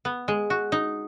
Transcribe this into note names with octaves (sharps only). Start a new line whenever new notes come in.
B3
G#3
F#4
D#4